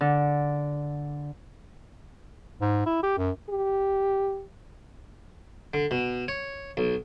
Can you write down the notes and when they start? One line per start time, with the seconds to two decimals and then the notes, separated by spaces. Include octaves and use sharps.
0.01 D3
2.61 G#2
2.86 E4
3.03 G4
3.18 F#2
3.50 G4
5.74 D3
5.91 B2
6.28 C#5
6.77 B1